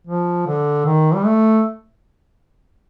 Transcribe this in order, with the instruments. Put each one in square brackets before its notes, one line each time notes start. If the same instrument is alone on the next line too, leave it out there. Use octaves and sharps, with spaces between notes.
[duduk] F3
D3
D#3
G3
A3